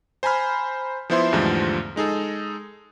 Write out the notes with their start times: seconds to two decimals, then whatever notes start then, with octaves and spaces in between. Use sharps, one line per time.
0.23 C5 G#5 A#5 B5 F6
1.10 F3 B3 E4 C5 E5 C6
1.33 E2 G#2 D3 F3 G3 A3
1.96 G#3 D#4 G#4 A4